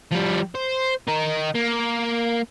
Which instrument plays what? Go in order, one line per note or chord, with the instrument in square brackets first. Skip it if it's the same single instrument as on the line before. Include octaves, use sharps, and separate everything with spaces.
[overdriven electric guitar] F3 G3
C5
D#4 A#4
A#3